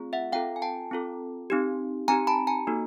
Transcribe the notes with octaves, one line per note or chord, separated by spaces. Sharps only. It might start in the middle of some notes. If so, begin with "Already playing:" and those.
Already playing: A3 C4 F4 G#4
E5 F#5
C4 F4 A4 F5 G5
G#5
G5 A5
C4 F4 A4
C4 D#4 G4
C4 D#4 G4 G#5 A#5
A5 B5
G#5 A#5
A#3 D#4 F#4 A4